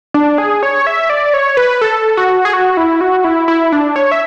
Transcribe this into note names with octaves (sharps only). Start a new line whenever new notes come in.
D4
G#4
C#5
E5
D5
C#5
B4
A4
F#4
G#4
F#4
E4
F#4
E4
E4
D4
C#5
E5